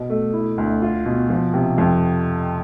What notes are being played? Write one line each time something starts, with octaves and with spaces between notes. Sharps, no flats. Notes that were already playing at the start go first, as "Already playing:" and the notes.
Already playing: B2
A3
E4
D2
F4
B2
F3
C3
F2